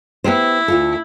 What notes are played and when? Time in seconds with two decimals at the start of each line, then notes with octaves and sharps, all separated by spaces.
0.24 B3 E4 G4 C5
0.68 D2 F4 A4